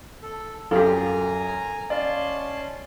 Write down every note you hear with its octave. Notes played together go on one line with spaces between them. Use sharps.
A4
F#2 F4 G4 A4 G#5 A#5
C#4 D5 D#5 F5 A5 C6